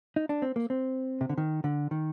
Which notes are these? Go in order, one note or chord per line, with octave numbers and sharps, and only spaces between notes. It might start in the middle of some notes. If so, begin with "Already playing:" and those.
D#4
D4
C4
A#3
C4
C3
D3
D#3
D3
D#3